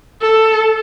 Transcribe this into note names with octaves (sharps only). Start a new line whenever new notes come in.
A4